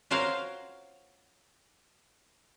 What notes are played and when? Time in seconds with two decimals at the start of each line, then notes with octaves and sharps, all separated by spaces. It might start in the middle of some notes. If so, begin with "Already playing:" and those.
0.11 F4 F#4 A#4 C5 C#5 F5